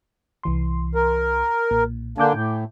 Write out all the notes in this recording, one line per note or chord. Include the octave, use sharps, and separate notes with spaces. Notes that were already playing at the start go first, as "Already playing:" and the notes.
C2 E3 C6
A#4
B1 A#2
D3 A#3 D4 G#5 D6 G6
A2